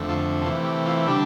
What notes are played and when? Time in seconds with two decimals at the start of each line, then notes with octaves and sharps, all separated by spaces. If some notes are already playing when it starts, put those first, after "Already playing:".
Already playing: F2 D3 A3
0.09 F4 A4
0.41 C3 E3 A3 F4 A4
0.64 G4
0.86 F4
1.07 D3 G3 D4 G4